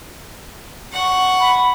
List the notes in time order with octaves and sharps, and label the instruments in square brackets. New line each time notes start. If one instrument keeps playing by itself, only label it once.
[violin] F#5 C#6
[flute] B5